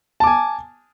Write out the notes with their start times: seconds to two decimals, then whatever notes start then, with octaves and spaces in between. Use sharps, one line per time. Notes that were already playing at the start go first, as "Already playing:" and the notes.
0.20 A5
0.24 D6
0.27 G#5